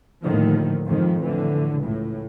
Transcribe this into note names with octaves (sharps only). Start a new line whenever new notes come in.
D#2 A2 D3 D#3 F3
F2 G#2 D#3 F3
A2 D3 E3
C#2 A2